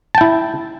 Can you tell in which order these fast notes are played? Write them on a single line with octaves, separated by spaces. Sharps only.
A5 G5 E4